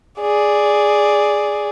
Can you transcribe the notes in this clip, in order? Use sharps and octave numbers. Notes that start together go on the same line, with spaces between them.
G#4 D5